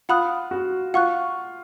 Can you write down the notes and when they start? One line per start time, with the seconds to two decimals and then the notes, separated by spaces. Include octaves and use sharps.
0.09 F4 F#5 B5 D#6 F#6
0.51 F#4
0.94 F4 F#5 C#6 F#6